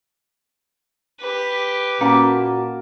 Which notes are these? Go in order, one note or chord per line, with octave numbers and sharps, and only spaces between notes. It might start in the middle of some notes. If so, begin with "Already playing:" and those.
G4 B4
A#2 A#3 C#4 F#4 F#5 A5